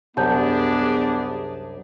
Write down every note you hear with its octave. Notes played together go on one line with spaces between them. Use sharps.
C2 F#2 B3 D4 G4 G#4 A5 G6